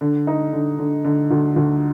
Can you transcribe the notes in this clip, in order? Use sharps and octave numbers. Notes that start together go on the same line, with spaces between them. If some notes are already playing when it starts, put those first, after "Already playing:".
D3
D#4
D3
D3
D3
D2
D2